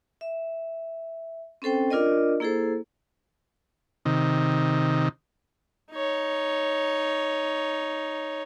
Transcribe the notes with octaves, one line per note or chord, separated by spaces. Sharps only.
E5
C4 C#4 A4 C5 G5
D4 F4 A#4 D5 D#5
A#3 E4 G#4 A4 C5
C3 D#3
D#4 C#5